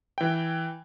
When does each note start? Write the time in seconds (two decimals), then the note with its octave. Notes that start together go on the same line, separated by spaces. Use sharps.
0.18 E3 G5